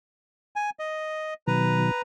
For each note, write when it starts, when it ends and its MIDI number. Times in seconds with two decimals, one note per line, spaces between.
0.56 0.70 80
0.79 1.34 75
1.47 1.91 47
1.47 1.91 51
1.47 1.91 54
1.47 2.02 71
1.47 2.02 82